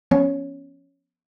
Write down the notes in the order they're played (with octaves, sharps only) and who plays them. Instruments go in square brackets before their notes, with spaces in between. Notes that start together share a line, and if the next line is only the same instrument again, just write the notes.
[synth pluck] F3 B3 C#4 C#5